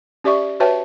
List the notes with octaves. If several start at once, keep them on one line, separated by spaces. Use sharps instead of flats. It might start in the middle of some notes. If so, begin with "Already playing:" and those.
C#4 G4 D5 E5 C#6
F#4 B4 C#5 E5 G5 A5